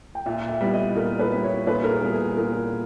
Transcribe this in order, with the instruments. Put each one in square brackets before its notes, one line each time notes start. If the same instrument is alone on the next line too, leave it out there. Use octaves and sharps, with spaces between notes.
[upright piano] G5
[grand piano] A#2 [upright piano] E5
[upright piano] E5
[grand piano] G3 B3 E4
[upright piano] D#5
[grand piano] A#2 [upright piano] A#4
[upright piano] B4
[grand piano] G3 B3 E4
[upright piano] C#5
[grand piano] A#2 [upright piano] B4
[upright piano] A#4
G#4
[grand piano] G3 B3 E4
[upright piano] G#4
[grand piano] A#2 [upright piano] A#4